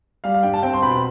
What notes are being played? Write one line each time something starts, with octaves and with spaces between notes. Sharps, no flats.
G3 F5
F5
G2 G5
A5
C4 G5
C6
B2 B5
B5